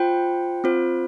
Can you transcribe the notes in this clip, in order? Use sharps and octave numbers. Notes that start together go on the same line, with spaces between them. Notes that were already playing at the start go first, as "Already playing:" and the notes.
Already playing: F4 C5 G5
C4 F4 C5